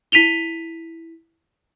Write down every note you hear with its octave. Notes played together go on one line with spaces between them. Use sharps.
E4 B6 D#7 F7 G7